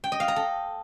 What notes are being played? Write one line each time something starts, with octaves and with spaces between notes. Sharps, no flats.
G5
D#5
F5
A#5
A4